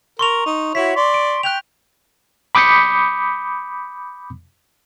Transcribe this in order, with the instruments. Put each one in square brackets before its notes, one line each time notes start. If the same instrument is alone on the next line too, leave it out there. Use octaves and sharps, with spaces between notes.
[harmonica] A#4 [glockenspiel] C6 C#6 F7
[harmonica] D#4
[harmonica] E4 F#4 C#5 [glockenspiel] B6
[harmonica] D5 C6
[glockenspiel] D7
[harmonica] G5 [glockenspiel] F#6 G6 F7
[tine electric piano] B5 D6 D#6 G6 B6 C#7